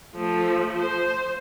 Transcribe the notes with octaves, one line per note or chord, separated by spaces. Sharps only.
F3 A3
C5